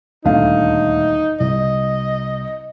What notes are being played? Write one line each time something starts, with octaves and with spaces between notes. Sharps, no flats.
D#1 D2 D#4 F5
C2 D#5